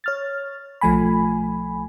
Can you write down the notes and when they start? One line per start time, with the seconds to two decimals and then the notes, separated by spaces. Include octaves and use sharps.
0.04 C#5 F6 A6
0.81 B1 F3 A3 G#5 B5